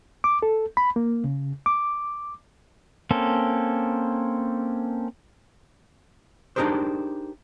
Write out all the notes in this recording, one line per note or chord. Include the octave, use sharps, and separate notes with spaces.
D6
A4
B5
A#3
C#3
D6
A#3 C4 C#4 A4
D4 D#4 G4 G#4 A#4 C5